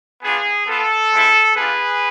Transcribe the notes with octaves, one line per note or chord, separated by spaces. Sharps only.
B3 D4 F4 G#4
B3 F4 A4
G#3 C4 E4
B3 D4 F4 G#4 B4